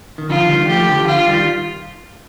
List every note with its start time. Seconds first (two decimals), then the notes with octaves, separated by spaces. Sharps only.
0.18 D#3
0.29 D3 F3 F4
0.49 D#3 G3
0.68 F3 A3 G4
0.88 D3 F3
1.07 F4
1.26 D#3 G3